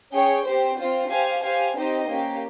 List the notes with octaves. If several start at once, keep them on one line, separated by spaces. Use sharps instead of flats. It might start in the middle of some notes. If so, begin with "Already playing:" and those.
C#4 G#4 C#5 G5
C4 G4 C5
C4 F4 C5
G4 C5 F5 G#5
G4 C5 F5 G#5
C4 D#4 G4 C5 D#5
A#3 C#4 G4